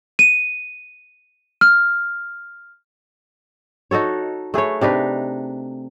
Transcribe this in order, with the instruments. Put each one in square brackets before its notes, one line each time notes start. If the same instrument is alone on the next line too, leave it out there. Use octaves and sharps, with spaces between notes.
[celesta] D#7
F6
[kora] D#4 F#4 A4 C#5
A3 G#4 B4 C#5
C3 D4 D#4 B4